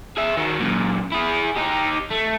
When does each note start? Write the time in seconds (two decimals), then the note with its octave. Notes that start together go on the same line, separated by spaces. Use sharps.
0.17 G#4 E5
0.37 D#3 F#4
0.60 F#2 A#2
1.12 E4 G#4
1.56 D#4 G4
2.11 A3